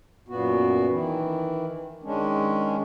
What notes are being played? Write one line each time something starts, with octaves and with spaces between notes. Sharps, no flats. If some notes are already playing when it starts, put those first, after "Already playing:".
F#2 A#2 B3 F#4
D#3 E3
D#3 G#3 C#4 D4